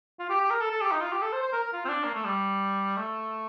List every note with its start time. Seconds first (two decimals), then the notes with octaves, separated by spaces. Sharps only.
0.19 F4
0.30 G4
0.40 G4
0.51 A#4
0.61 A4
0.71 A4
0.81 G4
0.92 D#4
1.02 F4
1.12 G4
1.23 A4
1.33 C5
1.43 C5
1.53 A#4
1.64 A#4
1.73 F4
1.85 C4
1.89 D4
2.05 A#3
2.15 A3
2.25 G3
2.97 A3